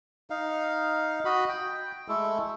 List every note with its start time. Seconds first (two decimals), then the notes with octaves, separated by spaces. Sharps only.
0.30 D#4 F5
1.25 F#4 D#5 B5
1.49 G5
2.08 G#3 A3 E4 A4